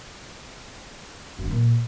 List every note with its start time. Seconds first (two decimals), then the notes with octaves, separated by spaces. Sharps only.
1.39 F#2
1.45 D3
1.51 A#2